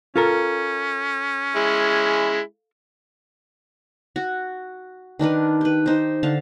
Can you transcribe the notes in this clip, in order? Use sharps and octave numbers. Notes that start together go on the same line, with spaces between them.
C#4 F4 A4 A#4
G#3 E4
F#4
D#3 D4 A#4 B4
G4 B4
D#4 C5
D3 F5 A5